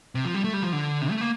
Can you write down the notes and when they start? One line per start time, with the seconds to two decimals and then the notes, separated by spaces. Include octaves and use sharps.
0.15 C3
0.25 F3
0.34 G3
0.44 A3
0.53 G3
0.63 F3
0.73 D3
1.02 C3
1.11 A3
1.21 A#3